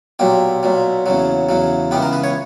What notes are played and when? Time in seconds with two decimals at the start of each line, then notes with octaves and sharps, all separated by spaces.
0.19 B1 A#2 F#3 G4
0.63 B1 A#2 F#3
1.06 E2 C#3 F#3
1.49 E2 C#3 F#3
1.91 C#2 C#3 E3 B3 G4
2.02 A#4
2.13 B4
2.24 C#5